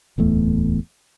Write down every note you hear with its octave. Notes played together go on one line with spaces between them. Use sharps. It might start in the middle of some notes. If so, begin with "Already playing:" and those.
D1 E2 A3